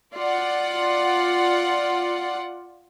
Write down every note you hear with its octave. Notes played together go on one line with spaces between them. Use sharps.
F4 D5 F#5